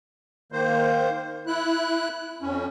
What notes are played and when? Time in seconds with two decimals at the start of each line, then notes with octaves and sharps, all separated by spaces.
0.52 D#3 A#3 C5
1.47 E4 F#6
2.42 F2 C#4